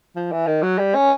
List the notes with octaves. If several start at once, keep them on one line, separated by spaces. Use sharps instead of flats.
F3
E3
D#3
F#3
G3
C#4